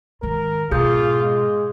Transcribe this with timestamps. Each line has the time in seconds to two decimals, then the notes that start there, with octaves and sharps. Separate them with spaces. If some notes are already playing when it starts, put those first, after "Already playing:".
0.22 G#2 D#3 A#4
0.71 G#2 B2 F4 G#4 D#6 G6
1.22 G#3